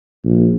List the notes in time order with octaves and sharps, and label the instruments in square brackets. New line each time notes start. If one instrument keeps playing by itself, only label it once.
[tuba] A#1